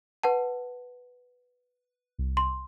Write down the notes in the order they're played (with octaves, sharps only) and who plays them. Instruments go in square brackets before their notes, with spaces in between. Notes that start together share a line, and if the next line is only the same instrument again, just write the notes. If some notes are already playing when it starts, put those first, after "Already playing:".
[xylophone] B4 F#5 A5
[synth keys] C2
[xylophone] C6